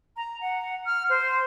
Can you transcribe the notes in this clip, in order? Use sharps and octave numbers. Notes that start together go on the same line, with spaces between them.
A#5
F#5
F6
C5